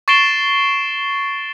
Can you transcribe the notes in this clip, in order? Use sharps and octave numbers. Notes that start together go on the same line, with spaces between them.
C#6 A6 C7 D7 E7 G7